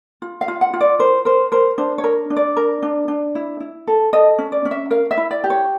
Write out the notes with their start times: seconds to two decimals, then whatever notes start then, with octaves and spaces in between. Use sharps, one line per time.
0.22 F4
0.41 F5
0.48 F4
0.61 F#5
0.74 F4
0.81 D5
0.99 A#4 C5
1.25 A#4 C5
1.52 A#4 C5
1.78 D4 C5
1.98 C#5
2.04 A#4
2.30 D4
2.37 D5
2.57 A#4
2.83 D4
3.08 D4
3.35 E4
3.60 E4
3.87 A4
4.13 A4 D#5
4.38 C#4
4.52 D5
4.65 C#4
4.71 E5
4.91 A#4 F5
5.11 E5
5.17 E4
5.31 D5
5.44 G4
5.50 C#5